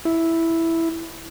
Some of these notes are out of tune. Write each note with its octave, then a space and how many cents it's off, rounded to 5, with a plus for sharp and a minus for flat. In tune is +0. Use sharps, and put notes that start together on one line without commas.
E4 +0